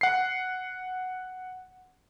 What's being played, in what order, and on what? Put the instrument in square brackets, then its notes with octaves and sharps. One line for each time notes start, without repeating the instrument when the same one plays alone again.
[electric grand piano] F#5 C7